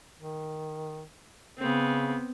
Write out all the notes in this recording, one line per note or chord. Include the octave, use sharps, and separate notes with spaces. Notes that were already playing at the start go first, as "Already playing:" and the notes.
D#3
C#3 B3 C4